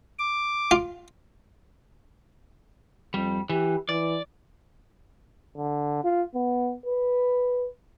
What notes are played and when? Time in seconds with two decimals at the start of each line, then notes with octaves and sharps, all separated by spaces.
0.19 D6
0.71 F4
3.14 F2 G3
3.50 E3 G4
3.89 E3 D5
5.57 D3
6.04 F4
6.34 B3
6.86 B4